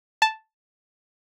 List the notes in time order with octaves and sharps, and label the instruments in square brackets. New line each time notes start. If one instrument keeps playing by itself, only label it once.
[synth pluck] A5